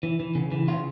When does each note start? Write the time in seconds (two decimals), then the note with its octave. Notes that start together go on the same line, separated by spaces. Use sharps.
0.03 E3
0.20 E3
0.35 C#3
0.52 E3
0.67 C#3 F4